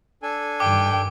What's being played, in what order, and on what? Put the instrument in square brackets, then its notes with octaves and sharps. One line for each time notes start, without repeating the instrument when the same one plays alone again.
[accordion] D4 A4 G#5
[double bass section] G2 D#3 [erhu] G5 [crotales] D6